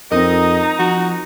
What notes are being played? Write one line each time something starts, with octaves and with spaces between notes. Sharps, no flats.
F2 C4 D#4 A#4 D#5 A#5
F3 F#4